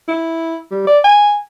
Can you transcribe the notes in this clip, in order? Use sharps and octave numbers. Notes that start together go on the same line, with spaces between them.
E4
G3
D5
G#5